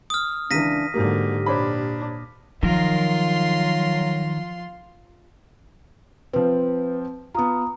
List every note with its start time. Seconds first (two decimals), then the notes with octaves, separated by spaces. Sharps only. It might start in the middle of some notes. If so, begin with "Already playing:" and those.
0.10 D#6 F6
0.51 C#2 E3 D4 A#6 B6 D#7
0.94 G#2 D3 F#3 A#3 G4
1.46 A#2 D4 C5 C#5 B5
2.63 D#3 F3 F#3 F4 A#4 C6
6.33 F3 C4 B4
7.35 B3 F4 A#5 D#6